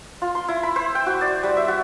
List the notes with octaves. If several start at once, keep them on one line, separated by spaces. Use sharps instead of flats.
F4
C6
E4
B5
C5
G5
F#4
D5
G3
E5
F#4